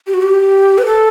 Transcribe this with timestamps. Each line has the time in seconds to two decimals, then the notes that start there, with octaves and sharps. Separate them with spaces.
0.07 G4
0.14 F#4
0.22 G4
0.78 B4
0.86 A4